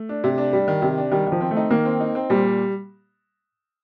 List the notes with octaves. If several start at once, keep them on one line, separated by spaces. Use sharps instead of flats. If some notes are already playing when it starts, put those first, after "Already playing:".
Already playing: A3
D4
C3
D4
G3
D#3
C3
D4
D#3 G3
D#3
F3
C4
A3
D#4
D#3 A#3
C4
D#4
C4
A#2 G3